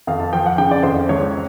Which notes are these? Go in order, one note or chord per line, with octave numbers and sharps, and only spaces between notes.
F2 F5
A5
F3 G5
F#5
C#3 G5
D5
F2 C5
C#2 C#5